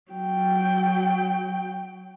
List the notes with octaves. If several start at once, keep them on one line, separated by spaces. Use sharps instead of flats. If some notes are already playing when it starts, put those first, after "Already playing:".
F#3 G5